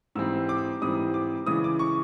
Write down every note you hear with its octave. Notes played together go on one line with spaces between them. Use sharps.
G#2 E3 G3 C4 E6
D6
G#2 E3 G3 C4 D#6
D6
C#3 E3 G#3 D#6
D6
C#6